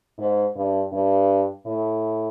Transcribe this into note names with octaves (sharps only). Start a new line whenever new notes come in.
G#2
G2
G2
A2